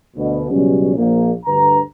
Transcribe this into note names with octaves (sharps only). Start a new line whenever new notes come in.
D2 B2
C#2 B2 F#3 G3 C#4
A#1 A#3
D2 G2 D3 B4 A#5